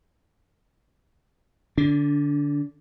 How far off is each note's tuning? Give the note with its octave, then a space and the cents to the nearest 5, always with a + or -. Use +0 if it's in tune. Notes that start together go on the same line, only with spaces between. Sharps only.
D3 +0 D4 -25